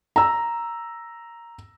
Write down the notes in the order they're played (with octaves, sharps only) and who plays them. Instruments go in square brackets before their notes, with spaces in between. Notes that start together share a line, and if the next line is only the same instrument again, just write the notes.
[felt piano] A#5 E6